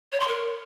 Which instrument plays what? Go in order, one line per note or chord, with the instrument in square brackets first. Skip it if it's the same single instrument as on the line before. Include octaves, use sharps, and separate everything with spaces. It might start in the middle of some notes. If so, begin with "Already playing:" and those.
[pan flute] C#5
C6
A#4